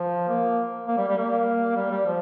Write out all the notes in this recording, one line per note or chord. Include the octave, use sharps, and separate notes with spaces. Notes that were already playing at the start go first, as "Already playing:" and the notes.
Already playing: F3
A#3
A#3
G3
G3
A#3
G3
G3
F3